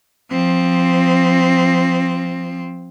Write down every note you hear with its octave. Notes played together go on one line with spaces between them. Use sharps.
F3 C4